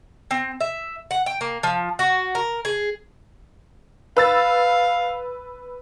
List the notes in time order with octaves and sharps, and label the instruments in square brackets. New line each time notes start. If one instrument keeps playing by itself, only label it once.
[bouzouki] C4
E5
F#5
G5
A#3
F3
F#4
A#4
G#4
[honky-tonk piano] B4 E6 A6 [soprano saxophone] F5